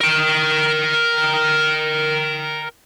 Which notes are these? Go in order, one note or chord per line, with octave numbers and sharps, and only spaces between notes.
A#4 G5